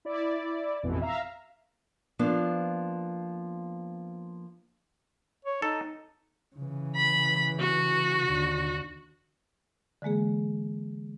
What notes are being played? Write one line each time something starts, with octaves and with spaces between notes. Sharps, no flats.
E4 D5
A1 F2 B2 E3
E5 F5 A#5
F3 A#3 B3 D4
C#5
D#4 A4
C#3 E3
B5
F#4
D#2 D3
D3 E3 G#3 A#3 G#4